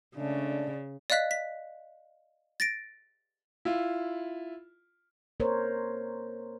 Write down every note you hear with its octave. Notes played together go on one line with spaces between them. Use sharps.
C#3 G#3 A3 D4 D5
D5 D#5 F5 F#6 B6
B6
A6 A#6 D7
E4 F4
A#3 A#4 C5 C#5